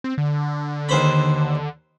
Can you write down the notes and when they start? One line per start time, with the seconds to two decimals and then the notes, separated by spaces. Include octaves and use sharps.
0.04 C4
0.18 D3
0.89 D#2 C5 B5